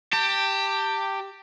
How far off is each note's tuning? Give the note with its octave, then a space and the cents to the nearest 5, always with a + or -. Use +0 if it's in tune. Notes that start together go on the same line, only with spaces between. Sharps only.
G4 +0 A5 +35